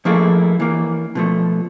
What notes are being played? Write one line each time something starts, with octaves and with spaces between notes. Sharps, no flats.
F3 A3 A#3 E4 G#4 A4
E3 A#3
B2 F3 A3